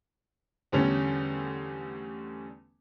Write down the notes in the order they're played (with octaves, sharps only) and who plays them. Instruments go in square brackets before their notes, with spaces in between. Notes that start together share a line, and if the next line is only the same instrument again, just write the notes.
[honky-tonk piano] E2 D3 G3 A3 C#4